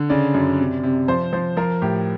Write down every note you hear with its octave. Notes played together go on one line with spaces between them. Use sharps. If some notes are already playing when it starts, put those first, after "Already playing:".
Already playing: D3
C#3 D5
F#2
C3
C3
F3 C5
F3 C5
F3 A#4
A2 G4